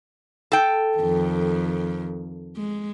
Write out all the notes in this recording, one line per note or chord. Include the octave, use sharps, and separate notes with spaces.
A4 G5
F2 D#3
G#3